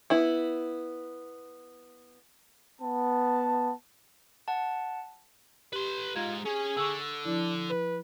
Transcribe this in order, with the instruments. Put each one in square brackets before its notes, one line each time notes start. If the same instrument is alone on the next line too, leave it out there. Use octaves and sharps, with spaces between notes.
[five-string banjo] B3 E4
[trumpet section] B3 A5
[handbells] F#5 A5
[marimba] G4 [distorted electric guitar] B4 C6
[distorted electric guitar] G#3 D#4 [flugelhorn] F4 [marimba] G#6
[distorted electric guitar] C#4 [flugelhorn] G#4
[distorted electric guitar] D3 [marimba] C#6 E6
[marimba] F3 E4 [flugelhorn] D4
[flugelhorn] B4